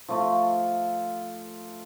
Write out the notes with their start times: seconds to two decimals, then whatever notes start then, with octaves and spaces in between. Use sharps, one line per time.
0.09 F3 A3 F4